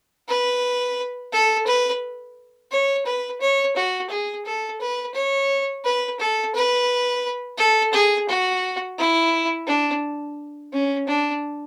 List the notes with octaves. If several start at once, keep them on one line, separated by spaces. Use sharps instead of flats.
B4
A4
B4
C#5
B4
C#5
F#4
G#4
A4
B4
C#5
B4
A4
B4
A4
G#4
F#4
E4
D4
C#4
D4